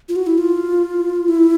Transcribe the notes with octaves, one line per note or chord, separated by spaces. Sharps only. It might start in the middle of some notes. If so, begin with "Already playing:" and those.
F4
F#4
E4
F4
E4